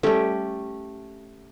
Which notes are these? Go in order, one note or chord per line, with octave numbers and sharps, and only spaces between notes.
G3 A3 C#4 G4 A4